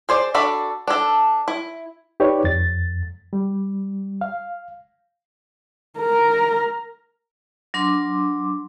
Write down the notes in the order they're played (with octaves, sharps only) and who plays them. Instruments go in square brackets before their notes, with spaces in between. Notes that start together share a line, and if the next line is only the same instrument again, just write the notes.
[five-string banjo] G#4 C5 D5
D4 F#4 A4 D5 B5
D4 A4
E4
[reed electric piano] D#4 G4 B4 C#5 D5
F2 A6
G3
F5
[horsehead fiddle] A#4
[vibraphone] F#3 D4 C6 D6